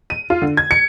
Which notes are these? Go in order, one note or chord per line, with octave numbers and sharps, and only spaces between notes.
D#7
F4
D3
G#6
C#7